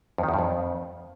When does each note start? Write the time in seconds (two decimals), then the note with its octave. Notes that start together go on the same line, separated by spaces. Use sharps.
0.18 F2
0.23 D#3
0.29 E2
0.34 G2
0.39 F2